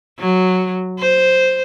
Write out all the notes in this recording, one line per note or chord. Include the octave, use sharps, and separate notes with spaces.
F#3
C5